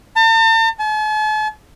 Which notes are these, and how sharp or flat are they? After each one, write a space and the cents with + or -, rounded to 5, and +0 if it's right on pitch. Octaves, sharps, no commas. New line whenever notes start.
A5 +45
A5 -45